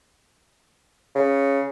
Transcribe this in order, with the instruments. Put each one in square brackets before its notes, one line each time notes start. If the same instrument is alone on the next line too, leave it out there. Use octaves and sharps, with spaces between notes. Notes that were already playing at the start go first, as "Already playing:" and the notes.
[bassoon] C#3